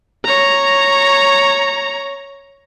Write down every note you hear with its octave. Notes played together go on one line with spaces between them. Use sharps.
C#5 A#5